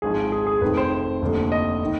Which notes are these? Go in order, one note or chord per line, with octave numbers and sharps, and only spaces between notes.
G#1 G#2 F3 G#4
G#4
G#4
F1 F2 D#3 B4
C5
F1 D#2 D3 F3
D#5
D#3